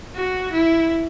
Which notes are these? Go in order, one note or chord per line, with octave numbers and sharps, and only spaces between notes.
F#4
E4